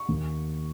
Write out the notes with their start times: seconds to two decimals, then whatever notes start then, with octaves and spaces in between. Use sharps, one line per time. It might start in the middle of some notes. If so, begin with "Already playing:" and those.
Already playing: C#6
0.09 D#2